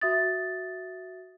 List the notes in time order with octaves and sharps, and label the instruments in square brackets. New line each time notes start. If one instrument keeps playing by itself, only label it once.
[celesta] F#4 E5 D#6 A6